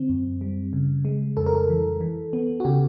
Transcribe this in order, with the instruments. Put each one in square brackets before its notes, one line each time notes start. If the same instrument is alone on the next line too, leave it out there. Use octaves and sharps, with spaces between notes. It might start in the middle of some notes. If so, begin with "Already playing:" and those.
Already playing: [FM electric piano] D3 C4
F#2
G3
C#3
G#3
F2 A4
A#4
A4
E3
E3
B3
F#4
C#3 G4